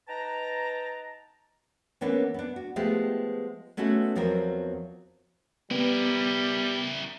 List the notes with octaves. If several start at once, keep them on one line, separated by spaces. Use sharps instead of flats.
D#4 B4 G5 A5 A#5
E3 A#3 B3 C#4 D4
B3 D4
F#4
F3 G#3 A3 B3 F4 G4
G#3 A3 B3 C#4 F#4 A4
E2 F3 F#3 C4 A#4
G3 B3 E4 A#4